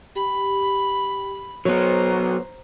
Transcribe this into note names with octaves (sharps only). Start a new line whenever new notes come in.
G4 B5
F#3 B3 C5 C#5 A#5 C6